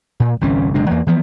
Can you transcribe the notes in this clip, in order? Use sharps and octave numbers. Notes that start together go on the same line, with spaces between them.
A#2
G1 C2 E3 C#4
F#1 C3 G#3 D4
E2 A#3
E3 F3 B3